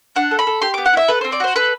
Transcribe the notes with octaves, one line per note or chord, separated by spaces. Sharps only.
D4 F#5
A4
B5
A4
G4 C6
B3 D6
F#5
E4 E5
A4 B4
C4 C5
D5
F#4 C5
A4 B4